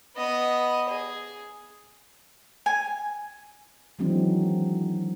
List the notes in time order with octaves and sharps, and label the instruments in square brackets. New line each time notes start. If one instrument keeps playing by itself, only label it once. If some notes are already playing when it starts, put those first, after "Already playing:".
[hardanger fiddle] B3 D#5
G#4
[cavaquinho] G#5
[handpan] D#3 E3 F#3 G#3 C4 D4